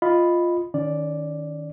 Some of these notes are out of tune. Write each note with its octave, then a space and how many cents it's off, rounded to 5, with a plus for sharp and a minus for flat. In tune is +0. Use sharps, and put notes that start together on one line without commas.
F4 +0 D#5 +0 B5 +0
D#3 +0 C#4 +25 D5 +0